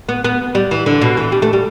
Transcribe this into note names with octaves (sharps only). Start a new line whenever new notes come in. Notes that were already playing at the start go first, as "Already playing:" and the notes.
B3
B3
G3
E3
D3
B2
E3
G3
A3
G3